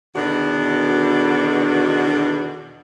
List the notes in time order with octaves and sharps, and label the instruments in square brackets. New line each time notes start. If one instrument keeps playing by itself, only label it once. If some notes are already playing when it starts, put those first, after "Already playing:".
[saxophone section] E2 B2 D3 D#3 D4 F#4